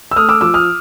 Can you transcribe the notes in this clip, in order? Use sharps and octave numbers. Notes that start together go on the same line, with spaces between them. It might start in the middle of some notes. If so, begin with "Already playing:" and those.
E6
A3 D#6 F6
D6 E6
F3 D6 E6
D#6 F6